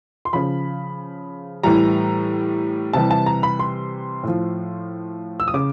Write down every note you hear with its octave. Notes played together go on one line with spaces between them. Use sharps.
C6
C#3 F3 B5
A2 E3 G3 A#5
C3 E3 G3 A5
A5
A#5
B5
C6
A2 F3
E6
D#6
C#3 D6